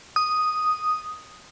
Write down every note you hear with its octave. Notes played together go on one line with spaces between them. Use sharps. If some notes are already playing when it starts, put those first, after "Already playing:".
D#6